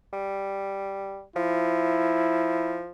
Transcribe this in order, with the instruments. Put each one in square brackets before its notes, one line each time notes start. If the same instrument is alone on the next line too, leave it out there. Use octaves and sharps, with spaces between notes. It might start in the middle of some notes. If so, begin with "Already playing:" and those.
[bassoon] G3
[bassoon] F3 [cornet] E4